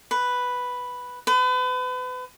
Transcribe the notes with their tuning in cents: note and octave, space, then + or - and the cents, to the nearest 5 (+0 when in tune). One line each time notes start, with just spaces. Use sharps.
B4 +0
B4 +35